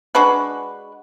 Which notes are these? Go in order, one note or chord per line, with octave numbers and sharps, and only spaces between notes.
G#3 D4 F#4 B4